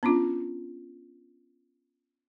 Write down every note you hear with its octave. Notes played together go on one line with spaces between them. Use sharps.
B3 C#4 D4 F4